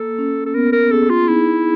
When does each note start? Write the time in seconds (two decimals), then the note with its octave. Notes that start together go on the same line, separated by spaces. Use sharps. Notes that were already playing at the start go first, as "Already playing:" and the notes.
Already playing: A#3 A4
0.18 C#4
0.46 A4
0.54 B3 A#4
0.73 A#4
0.91 G#4 A4
1.10 F4
1.27 D#4 E4